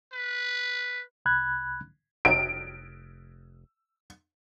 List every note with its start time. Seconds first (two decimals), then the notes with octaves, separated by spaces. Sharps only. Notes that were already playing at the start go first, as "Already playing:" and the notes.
0.13 B4
1.26 C2 B5 F#6 G#6
2.25 F1 D7